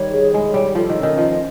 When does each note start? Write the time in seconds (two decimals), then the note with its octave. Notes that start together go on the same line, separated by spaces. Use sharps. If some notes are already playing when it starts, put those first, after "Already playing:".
Already playing: D#3 G3 C#5
0.12 G#4
0.33 G#3 E4
0.54 G3 C#5
0.75 F3 A4
0.89 D#3
0.97 C#4
1.03 D#3
1.17 F3 D#5